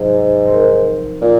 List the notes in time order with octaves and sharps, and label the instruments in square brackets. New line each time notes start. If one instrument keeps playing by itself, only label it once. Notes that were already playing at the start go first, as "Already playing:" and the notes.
Already playing: [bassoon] G#2 [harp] C3 F#3 C#4
[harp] F3 C4 D#4 F#4 A#4
[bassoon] A#2